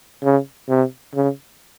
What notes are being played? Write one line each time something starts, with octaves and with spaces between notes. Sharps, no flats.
C#3
C3
C#3